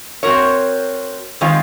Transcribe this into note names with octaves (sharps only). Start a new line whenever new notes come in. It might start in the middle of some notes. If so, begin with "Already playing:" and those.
C4 F#4 A#4 C#5
D#3 G#3 C4 F4